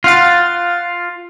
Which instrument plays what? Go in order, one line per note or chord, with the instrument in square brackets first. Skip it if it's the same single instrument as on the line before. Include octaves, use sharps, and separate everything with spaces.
[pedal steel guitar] F4 [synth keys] F5 F#5 A6